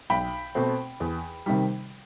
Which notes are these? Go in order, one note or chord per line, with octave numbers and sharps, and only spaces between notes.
B1 G5 B5
B2 A3 C4
E2
C3 D#3 G3